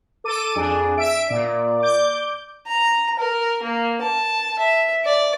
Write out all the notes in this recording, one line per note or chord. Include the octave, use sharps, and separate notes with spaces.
A4 D6 D#7
F2 D4 G#4
E5 D7
A#2 D5
D6 G6
A#5
A#4
A#3
A5
E5
D5